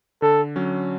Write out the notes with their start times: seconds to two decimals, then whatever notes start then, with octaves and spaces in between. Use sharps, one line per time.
0.22 D3 A4
0.56 F#3 C#4